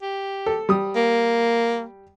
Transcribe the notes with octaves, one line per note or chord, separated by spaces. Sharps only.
G4
A4
G3 D#6
A#3